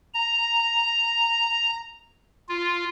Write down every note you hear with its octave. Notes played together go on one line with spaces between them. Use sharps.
A#5
F4